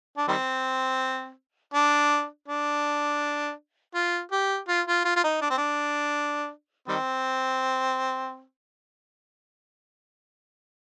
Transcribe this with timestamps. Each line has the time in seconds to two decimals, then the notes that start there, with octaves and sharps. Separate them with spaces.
0.17 D4
0.28 D#3 G3 C4
1.74 D4
2.48 D4
3.94 F4
4.32 G4
4.69 F4
4.87 F4
5.05 F4
5.16 F4
5.24 D#4
5.41 D4
5.50 C4
5.58 D4
6.88 D#3 G3 C4